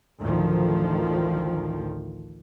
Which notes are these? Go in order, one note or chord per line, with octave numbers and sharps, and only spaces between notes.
A1 D2 D#3 F3